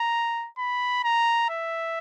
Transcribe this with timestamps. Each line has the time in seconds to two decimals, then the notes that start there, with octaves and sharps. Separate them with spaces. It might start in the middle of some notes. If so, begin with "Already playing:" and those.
Already playing: A#5
0.58 B5
1.04 A#5
1.50 E5